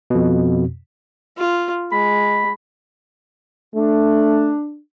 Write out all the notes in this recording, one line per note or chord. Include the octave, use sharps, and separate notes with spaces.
F2 B2
F4
G#3 B5
A3 D4